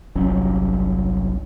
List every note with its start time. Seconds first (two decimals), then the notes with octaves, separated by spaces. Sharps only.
0.15 G1 C2 F#3 C#4